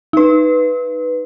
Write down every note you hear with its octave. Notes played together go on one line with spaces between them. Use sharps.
D#4 B4